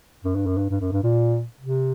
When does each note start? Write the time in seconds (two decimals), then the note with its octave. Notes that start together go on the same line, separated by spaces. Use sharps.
0.24 F#2
0.36 G2
0.47 F#2
0.58 G2
0.70 G2
0.81 F#2
0.92 G2
1.03 A#2
1.60 C3